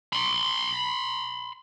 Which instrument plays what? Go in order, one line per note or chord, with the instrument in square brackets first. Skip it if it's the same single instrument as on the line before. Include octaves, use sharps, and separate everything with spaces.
[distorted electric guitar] B5 C6